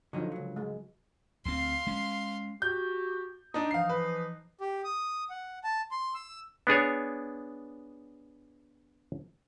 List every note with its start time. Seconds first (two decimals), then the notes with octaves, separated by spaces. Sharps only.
0.13 D3 F3 F#3 D#4
0.32 C#2 F#3
0.56 G#3
1.46 D2 C4 F5 C6
1.87 G#3 C#4
2.62 F#4 G4 G6
3.54 D4 D#4 D#6
3.71 E3 F3 D#4 F5 C7
3.89 B4
4.61 G4
4.84 D#6
5.30 F#5
5.64 A5
5.91 C6
6.15 E6
6.67 B3 D4 G#4 C#5